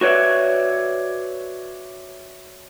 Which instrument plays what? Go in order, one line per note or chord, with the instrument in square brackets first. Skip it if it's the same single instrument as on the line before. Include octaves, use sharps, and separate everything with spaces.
[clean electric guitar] F#4 B4 C#5 D5 E5